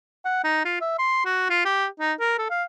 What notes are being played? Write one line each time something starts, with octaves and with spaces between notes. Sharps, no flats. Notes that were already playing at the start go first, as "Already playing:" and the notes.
F#5
D#4
F4
E5
C6
F#4
F4
G4
D#4
A#4
A4
F5